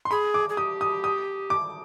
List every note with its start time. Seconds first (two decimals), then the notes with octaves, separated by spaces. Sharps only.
0.05 C6
0.11 G#4 B5
0.34 D6
0.49 G#4
0.57 G4 D#6
0.81 D#6
1.04 D#6
1.50 D6